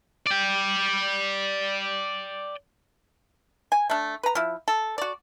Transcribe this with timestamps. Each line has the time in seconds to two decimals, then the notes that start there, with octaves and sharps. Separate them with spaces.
0.26 D5 G5
3.72 G#5
3.90 A3 D4
4.23 B4 A#5
4.35 F3 E4
4.68 A4
4.98 F#4 D5